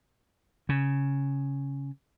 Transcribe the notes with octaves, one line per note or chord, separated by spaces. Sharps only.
C#3